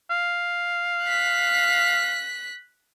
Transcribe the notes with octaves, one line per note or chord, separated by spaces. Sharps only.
F5
F#6 B6